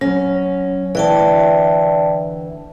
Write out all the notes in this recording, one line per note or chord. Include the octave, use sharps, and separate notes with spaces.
F#3 C#4
D2 E3 D5 G5 A5